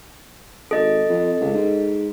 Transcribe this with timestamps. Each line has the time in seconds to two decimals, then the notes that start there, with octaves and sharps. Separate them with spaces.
0.71 G#1 A4 D#5
1.09 F2
1.40 C#2
1.54 G#2